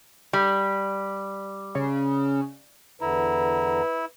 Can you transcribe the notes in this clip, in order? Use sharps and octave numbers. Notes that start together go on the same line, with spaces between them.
G3
C#3
E2 D3 E4 B4 A#5